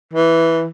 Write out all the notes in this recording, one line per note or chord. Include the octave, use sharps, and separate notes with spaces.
E3